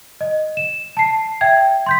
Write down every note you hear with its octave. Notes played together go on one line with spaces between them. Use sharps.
D#5
E7
A5 C7
E5 G5 G#6
C6 G6 B6